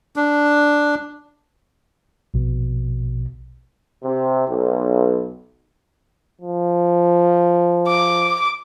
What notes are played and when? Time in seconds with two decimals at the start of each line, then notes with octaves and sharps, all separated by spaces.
0.16 D4
2.34 A#1 B2
4.03 C3
4.47 B1
6.41 F3
7.87 D6